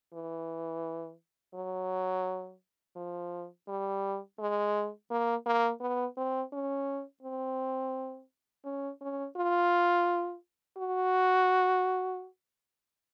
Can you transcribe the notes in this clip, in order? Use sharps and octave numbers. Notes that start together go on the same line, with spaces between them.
E3
F#3
F3
G3
G#3
A#3
A#3
B3
C4
C#4
C4
C#4
C#4
F4
F#4